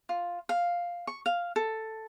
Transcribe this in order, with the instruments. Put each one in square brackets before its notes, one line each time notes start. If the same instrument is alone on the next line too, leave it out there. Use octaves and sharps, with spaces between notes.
[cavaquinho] F4
F5
C#6
F5
A4